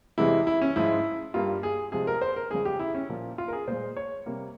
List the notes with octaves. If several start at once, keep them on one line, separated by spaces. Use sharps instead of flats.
E2 C3 E3 G#3 E4
E4
C#4
G#2 F3 G#3 E4
G2 G3 A#3 F4
G#4
C3 F3 G#3 G#4
A#4
C5
A#4
E2 C#3 F3 G#3 G#4
G4
E4
C#4
A#2 F3 A#3
F4
A#4
G#4
A#2 G#3 C5
C#5
C3 G3 A#3